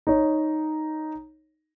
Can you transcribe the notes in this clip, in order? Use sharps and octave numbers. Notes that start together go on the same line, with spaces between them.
D#4 C#5